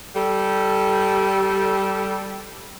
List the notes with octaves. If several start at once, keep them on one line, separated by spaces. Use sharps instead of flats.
G3 A4